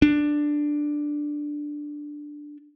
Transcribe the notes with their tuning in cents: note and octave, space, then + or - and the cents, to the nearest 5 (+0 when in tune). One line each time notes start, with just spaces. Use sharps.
D4 +5